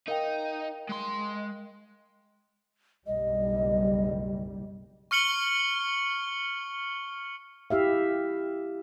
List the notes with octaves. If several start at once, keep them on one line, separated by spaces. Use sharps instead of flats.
D#4 A#4 F5 G5
G#3 C6
F#1 B1 G3 D#5
C#6 F6 C#7 F#7 G7
E4 G4 E5 F5